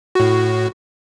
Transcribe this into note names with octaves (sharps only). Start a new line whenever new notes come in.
A2 F#4